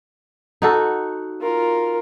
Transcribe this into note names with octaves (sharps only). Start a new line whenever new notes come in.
D#4 F#4 A4
F4 A#4